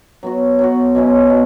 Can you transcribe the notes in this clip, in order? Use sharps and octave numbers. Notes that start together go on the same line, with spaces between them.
F#3 B3 F#4
F#3 B3 F#4
B2 F#3 C#4 E4
B2